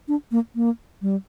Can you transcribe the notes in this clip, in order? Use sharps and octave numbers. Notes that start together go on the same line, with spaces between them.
D4
A#3
A#3
G3